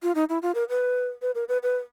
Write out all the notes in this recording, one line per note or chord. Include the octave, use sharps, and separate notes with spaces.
F4
D#4
E4
F4
A#4
B4
B4
A#4
B4
B4